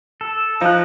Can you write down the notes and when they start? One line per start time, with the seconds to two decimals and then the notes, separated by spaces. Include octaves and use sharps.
0.21 A4
0.61 F3 D#4 F#6